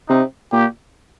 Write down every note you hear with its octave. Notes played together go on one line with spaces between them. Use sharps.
C3 D#4
A#2 G4